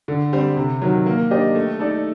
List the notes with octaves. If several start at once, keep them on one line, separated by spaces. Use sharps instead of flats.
D3
G3 C4
C3
D#3 F#3
A#3
D4 G4 C5 D#5
A3
D#4 A4 D5